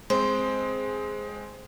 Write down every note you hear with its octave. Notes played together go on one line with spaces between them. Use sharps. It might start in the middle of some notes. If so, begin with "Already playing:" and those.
G#3 C4 C5